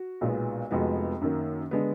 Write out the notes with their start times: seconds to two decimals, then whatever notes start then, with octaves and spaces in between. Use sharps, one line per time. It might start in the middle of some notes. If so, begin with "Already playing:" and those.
Already playing: F#4
0.21 B1 A#2 G#3 B3
0.71 F1 F2 F3 G#3 B3 F#4
1.21 F#2 D#3 A#3
1.71 D3 G#3 B3